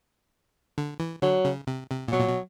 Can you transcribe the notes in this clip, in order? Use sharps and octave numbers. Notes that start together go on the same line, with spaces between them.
D3
E3
D3 F#3
C#3
C3
C3
A#2
B2 F#3
A#2
B2